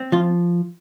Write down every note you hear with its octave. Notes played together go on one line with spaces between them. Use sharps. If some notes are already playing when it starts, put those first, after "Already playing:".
Already playing: C4
F3 F4